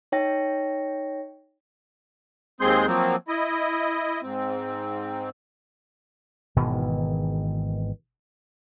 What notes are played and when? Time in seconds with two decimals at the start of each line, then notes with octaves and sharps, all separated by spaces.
0.12 D#4 C#5 G5 A#6
2.60 D#2 G#3 C4 G#4 C6 G6
2.87 F3 F#3 A#3 C4
3.28 E4 D#5
4.23 G#2 C4
6.56 G#1 B2 D#3 E3